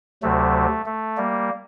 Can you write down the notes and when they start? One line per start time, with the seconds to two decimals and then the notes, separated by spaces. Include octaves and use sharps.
0.23 D2 C3 F#3 A3
0.86 A3
1.17 G3 A#3